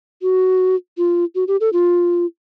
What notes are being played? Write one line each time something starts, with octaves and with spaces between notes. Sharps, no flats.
F#4
F4
F#4
G4
A4
F4